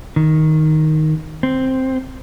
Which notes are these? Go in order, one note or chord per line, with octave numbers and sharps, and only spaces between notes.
D#3
C4